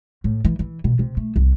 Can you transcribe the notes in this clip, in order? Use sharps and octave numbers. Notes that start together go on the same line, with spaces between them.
A2
E3
E3
B2
C3
A3
C2